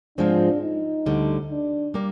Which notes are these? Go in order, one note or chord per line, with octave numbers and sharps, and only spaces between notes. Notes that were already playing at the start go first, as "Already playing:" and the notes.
G#2 F3 G#3 C4 D4 F4
D#4
D2 D3 G3
D4
G3 A#3